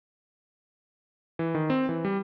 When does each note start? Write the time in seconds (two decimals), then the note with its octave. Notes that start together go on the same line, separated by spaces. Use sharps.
1.39 E3
1.55 D#3
1.70 C4
1.89 E3
2.05 G3